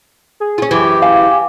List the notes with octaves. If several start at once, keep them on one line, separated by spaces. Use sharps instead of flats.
G#4
C#4 F4
F#2 E3 G4
F5 G#5